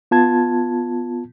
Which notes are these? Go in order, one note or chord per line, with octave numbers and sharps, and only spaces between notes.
B3 F4 A5 G#6